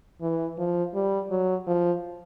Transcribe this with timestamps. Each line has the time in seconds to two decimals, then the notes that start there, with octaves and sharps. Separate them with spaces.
0.21 E3
0.58 F3
0.94 G3
1.30 F#3
1.67 F3